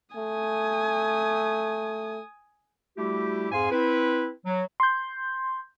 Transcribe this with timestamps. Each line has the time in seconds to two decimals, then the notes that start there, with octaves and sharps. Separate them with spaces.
0.16 A3 G#5 D#6
2.97 G3 A3 E4 F#4 G4
3.52 F2 G#2 G#4 F5 G#5 C6
3.71 C4 E4 B4
4.46 F#3
4.80 C6 G6